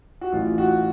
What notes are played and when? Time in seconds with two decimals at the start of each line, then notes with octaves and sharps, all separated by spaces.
0.21 F#4
0.32 A1 A2 E3 F4
0.58 F#4